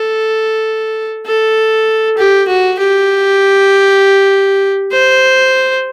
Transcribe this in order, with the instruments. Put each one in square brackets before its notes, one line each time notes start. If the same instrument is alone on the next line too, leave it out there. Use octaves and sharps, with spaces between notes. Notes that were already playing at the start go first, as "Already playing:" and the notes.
Already playing: [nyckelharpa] A4
A4
G4
F#4
G4
C5